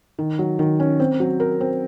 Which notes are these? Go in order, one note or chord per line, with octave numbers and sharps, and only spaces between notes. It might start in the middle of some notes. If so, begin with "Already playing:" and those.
D#3
F#3
D#3
C#4
C4
F#3
A#4
C4